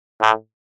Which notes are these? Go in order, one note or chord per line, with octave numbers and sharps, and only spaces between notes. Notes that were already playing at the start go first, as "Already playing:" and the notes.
A2